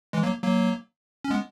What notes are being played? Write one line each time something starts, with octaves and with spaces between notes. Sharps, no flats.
E3 G#3
F#3 A#3
F#3 A#3
C#4
G#3 B3